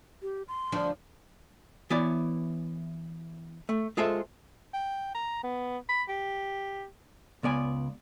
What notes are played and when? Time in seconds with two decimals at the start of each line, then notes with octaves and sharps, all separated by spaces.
0.22 G4
0.48 C6
0.72 D2 F3 D4
1.90 E3 B3 E4 C#5 D5
3.69 A3
3.97 G#3 F4 G#4 A4 C5 E5
4.74 G5
5.15 A#5
5.43 B3
5.89 B5
6.08 G4
7.43 C#2 B3 D5 G#5